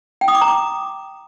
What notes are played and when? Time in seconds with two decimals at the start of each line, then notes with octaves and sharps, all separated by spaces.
0.21 G5
0.28 D#6
0.35 D6
0.41 A#5
0.48 D6